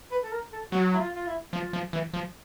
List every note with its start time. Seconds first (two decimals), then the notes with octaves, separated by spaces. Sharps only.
0.11 B4
0.23 A4
0.32 A#4
0.52 A4
0.72 F#3 F#4
0.94 E4
0.99 F4
1.15 F4
1.27 E4
1.53 F3 F4
1.73 F3
1.93 E3
2.14 F3